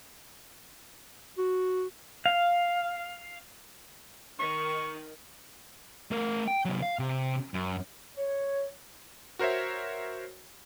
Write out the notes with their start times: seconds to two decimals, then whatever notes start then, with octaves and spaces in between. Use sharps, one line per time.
1.38 F#4
2.26 F5
4.39 D#3 C#6
6.11 A3 A#4
6.47 G5
6.65 C3 F#3
6.82 F5
6.99 C3
7.54 F#2
8.15 C#5
9.39 F#4 A#4 C5 C#5 E5